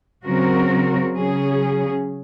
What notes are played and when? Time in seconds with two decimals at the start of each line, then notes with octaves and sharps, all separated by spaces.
0.25 C#3 F#3 C4 F#4 A#4
1.15 C#3 F#3 C#4 G#4